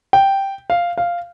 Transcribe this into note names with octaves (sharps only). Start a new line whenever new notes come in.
G5
F5
F5